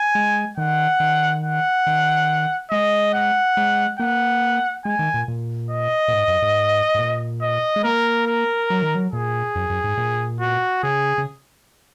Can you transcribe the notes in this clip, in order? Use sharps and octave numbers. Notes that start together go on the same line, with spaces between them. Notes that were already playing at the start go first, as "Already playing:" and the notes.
Already playing: G#5
G#3
D#3 F#5
D#3
F#5
D#3
G#3 D#5
F#5
G#3
A#3 F#5
G#3 G#5
D#3
A#2
A#2
D#5
A#2
G#2
F#2
G#2
G#2
A#2
D#5
G#3
A#3 A#4
A#4
F#3
D#3
F#3
A#2 G#4
F#2
F#2
G#2
A#2
F#4
C#3 G#4
C#3